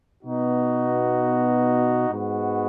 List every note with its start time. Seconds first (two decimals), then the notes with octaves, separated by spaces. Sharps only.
0.23 B2 B3 D#4 F#4
2.10 G#2 G#3 B3 F#4